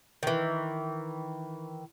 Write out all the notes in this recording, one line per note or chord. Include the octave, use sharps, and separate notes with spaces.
D#3 E3